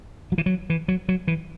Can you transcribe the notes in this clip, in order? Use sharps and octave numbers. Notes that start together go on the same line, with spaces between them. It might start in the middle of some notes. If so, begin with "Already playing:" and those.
F#3
E3
F#3
E3
F#3
F#3
E3